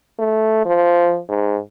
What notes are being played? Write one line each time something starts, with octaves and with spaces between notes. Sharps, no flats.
A3
F3
G#2